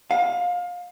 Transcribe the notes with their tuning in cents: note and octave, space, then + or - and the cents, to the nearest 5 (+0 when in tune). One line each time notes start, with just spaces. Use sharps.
F5 +25